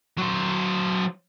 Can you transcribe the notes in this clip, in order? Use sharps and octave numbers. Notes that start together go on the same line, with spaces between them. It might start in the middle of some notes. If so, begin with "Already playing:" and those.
F#3 C5